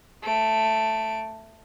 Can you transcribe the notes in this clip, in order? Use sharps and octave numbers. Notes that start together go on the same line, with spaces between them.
A3 D7